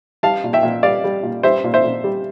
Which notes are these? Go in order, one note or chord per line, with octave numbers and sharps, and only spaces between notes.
G3 F5 A5
A#2
E5 G5
A#2
G3 D5 F5
G3
A#2
G3 C5 E5
A#2
C5 E5
A#2
G3